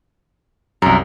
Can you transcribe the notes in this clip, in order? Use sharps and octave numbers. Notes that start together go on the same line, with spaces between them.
C2 F#2 A#4